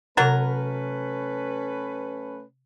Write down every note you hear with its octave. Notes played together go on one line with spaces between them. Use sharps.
C3 F#3 A3 C#4 A#4 B4 A6